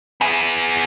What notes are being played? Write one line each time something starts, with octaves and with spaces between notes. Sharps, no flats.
B3 G#4